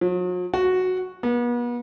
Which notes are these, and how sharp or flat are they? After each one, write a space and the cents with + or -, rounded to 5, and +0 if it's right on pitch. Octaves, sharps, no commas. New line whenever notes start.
F#3 -45
F#4 -5
B3 -40